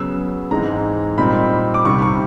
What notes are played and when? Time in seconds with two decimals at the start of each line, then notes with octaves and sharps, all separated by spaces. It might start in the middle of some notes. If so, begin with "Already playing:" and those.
Already playing: C#3 F#3 B3 E6
0.51 G#2 E3 G#3 C4 D#4 A#5
1.18 A#2 G3 C4 D#4 B5
1.74 D6
1.85 C2 C3 D#3 G3 C#6
2.02 C#6